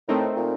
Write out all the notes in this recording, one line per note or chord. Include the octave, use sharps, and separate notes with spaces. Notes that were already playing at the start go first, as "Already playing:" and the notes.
A2 A3 C4 D#4 A#4
A#2